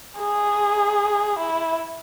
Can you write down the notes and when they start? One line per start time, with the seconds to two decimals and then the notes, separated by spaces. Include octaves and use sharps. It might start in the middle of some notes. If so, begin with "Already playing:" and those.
0.19 G#4
1.39 E4